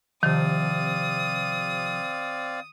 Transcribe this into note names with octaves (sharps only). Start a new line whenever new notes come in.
C3 D#3 F3 C4 D5 F5 D#6